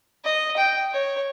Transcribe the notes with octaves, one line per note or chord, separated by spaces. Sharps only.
D#5
G5
C#5